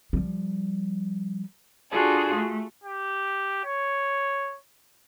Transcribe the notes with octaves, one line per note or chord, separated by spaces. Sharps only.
F3 G3
D4 F4 F#4 G#4 A4
A3
G4
C#5